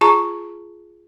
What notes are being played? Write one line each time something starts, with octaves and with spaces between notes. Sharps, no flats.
F4 G#4 A5 A#5 C#6